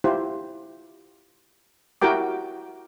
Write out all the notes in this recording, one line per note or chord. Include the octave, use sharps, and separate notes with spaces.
E4 F4 G4 C5
E4 F#4 G4 A#4 G5 D6